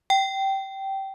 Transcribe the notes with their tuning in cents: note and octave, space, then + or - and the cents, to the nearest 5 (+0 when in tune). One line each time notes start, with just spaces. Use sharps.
G5 -15